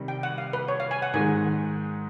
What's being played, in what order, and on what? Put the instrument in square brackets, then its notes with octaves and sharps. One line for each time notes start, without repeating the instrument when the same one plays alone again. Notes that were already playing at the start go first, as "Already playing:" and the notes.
Already playing: [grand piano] C3 D#3 G3
[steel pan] G5
F#5
F5
B4
C#5
F5
G#5
F#5
[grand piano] G#2 D#3 G#3 [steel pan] G#5